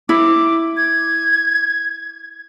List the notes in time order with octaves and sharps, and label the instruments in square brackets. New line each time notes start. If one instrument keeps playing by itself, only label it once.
[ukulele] E4 [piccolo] D6
[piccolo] G#6